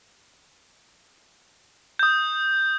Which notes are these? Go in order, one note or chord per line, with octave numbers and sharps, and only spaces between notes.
D#6 G6